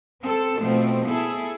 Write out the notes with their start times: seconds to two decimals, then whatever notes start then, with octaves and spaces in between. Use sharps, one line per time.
0.25 C4 A4
0.61 B2 F3 A3 C4
1.07 B3 E4 G#4 A4